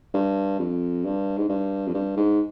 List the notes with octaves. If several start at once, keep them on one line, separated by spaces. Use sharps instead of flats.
G2
F2
G2
G#2
G2
F2
G2
G#2